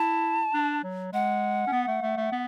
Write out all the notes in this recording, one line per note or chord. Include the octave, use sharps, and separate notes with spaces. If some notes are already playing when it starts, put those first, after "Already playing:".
Already playing: E4 A5
D4
F#3
G#3 F#5
C#4
B3
A3
A3
A3
B3